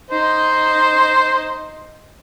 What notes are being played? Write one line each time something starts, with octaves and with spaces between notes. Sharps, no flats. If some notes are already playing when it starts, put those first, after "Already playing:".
D#4 C5 D#5